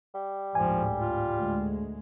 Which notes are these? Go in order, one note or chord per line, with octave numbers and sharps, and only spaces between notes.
G3
G#1 D2 A2 F3 G#5
F4
D2 G#3